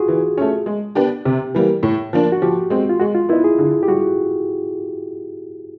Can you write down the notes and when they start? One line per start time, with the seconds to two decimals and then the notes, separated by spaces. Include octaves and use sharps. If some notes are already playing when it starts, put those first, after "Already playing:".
Already playing: F4 F#4 G#4
0.08 E3
0.38 A3 C#4
0.66 G#3
0.95 B3 D4 G4
1.25 C3 G4
1.54 E3 G3 A#3
1.83 A2
2.13 F3 A#3 D4
2.32 F#4
2.42 F3 G4
2.70 G#3 C4
2.89 F4
3.00 G#3 F#4
3.15 F4
3.29 B3 E4
3.33 D#4
3.44 G#4
3.58 D3
3.83 G4
3.88 G3 F#4